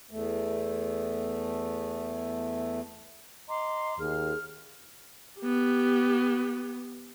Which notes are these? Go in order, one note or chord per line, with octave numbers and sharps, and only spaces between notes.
E2 A3
D#5 A#5 C6 D6
D#2 G#4 F6
B3 G4